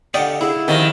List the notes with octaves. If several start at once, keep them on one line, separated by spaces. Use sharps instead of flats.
D3 F4 G4 D5 D#5 F#5 G5
E4 G#4
C3 D#3 F3 D#5